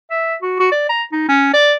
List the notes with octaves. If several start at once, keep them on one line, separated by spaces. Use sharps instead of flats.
E5
F#4
F#4
D5
A#5
D#4
C#4
D5